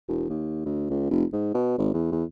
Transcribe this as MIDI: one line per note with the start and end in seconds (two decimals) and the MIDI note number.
0.09 0.25 28
0.29 0.64 39
0.66 0.90 38
0.90 1.09 37
1.10 1.25 29
1.33 1.54 44
1.54 1.76 47
1.78 1.93 32
1.94 2.09 40
2.12 2.24 40